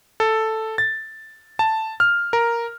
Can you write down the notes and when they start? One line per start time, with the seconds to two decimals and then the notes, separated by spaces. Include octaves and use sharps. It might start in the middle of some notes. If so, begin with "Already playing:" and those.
0.20 A4
0.78 A6
1.59 A5
2.00 F6
2.33 A#4